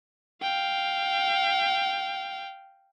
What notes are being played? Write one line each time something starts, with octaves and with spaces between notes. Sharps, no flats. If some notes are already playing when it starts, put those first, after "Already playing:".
F5 G5